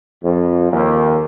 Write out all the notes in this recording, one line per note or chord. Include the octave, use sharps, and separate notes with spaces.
F2
D#2